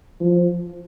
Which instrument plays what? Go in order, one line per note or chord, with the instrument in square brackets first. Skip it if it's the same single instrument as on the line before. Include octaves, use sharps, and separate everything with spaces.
[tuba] F3